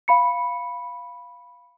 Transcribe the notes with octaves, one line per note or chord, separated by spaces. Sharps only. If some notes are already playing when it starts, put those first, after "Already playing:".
F5 B5 C#7